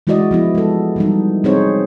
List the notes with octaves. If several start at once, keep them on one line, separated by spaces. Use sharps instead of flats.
E3 G#3 E4 F#4 D5 D#5
F3 B3 E4
G#3 A4
E3 G3 D#4
C4 D#4 G#4 C5 C#5